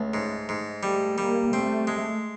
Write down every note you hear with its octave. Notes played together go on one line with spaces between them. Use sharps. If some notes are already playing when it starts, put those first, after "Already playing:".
Already playing: C#2 A3
G#2
G#2
G3 A3
G3 A#3
A3 C4
G#3